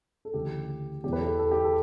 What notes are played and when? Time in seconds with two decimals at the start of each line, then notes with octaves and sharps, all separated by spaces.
0.25 A4
0.34 D2 C#3 E3 G4
1.04 E2 B2 G4
1.13 B4
1.21 A4
1.39 A4
1.51 G4
1.64 A4